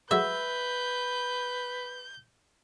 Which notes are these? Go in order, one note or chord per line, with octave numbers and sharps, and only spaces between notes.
F#3 G#3 A3 B4 E5 G6